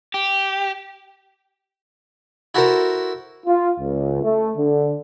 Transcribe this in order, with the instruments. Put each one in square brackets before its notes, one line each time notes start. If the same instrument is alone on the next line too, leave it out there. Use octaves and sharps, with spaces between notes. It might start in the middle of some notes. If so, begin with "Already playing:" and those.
[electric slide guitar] G4
[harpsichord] E4 F#4 A4 A#4 C5 A#5
[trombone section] F4
C#2
A3
D3